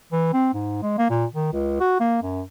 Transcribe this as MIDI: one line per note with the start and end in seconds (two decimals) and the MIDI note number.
0.12 0.31 52
0.34 0.49 60
0.54 0.80 44
0.83 0.96 56
0.98 1.07 58
1.10 1.25 46
1.35 1.49 51
1.53 1.76 37
1.80 2.00 66
2.00 2.21 58
2.23 2.42 42